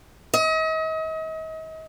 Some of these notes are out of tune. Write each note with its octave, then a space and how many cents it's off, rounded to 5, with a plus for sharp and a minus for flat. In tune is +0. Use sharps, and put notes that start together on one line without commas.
D#5 +40